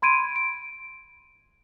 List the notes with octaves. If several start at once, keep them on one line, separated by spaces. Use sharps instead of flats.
B5 C6 G#6 D7 D#7
D7